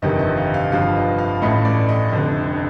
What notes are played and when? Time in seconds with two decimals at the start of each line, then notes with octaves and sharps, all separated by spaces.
0.02 G1 F2 C3 D#3 D#5
0.19 D#5
0.37 F5
0.54 F5
0.72 G1 G2 F3 F5
0.96 D#5
1.18 F5
1.42 A1 A2 A3 D#5
1.65 D5
1.89 D#5
2.12 F1 F2 D3